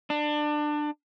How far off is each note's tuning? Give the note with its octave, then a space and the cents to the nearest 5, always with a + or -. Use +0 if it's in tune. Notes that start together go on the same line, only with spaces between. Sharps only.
D4 +25